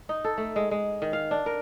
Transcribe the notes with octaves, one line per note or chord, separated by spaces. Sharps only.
D#4
A4
A3
G#3
G#3
D#3
F5
D4
A#4